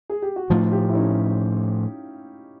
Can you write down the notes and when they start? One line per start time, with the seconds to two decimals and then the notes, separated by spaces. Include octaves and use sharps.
0.10 G#4
0.22 G4
0.36 F#4
0.50 A2 F3 A3 D#4 F4
0.72 F4 G4
0.90 E4
0.95 C#4 D#4